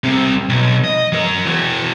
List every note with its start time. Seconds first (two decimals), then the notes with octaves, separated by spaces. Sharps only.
0.04 C2 C3
0.49 B1
0.84 D#5
1.12 F#3 A#4
1.46 E3 F#4